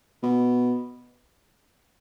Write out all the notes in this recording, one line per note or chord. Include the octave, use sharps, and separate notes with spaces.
B2